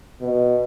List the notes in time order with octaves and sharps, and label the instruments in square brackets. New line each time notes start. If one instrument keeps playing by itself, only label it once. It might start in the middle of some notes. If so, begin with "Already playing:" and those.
[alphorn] B2